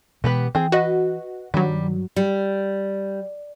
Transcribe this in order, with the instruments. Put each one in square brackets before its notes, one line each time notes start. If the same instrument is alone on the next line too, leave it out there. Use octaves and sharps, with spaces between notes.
[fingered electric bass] B2 E3 G#3 [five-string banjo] B3 G4 B4
[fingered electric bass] E3 [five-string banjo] C4 G#4
[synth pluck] F#4 [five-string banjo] B4 D#5
[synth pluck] G2 F#3 [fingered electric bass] D#3 [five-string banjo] G3
[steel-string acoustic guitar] G3